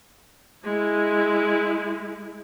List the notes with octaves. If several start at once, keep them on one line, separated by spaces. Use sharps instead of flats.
G#3 E4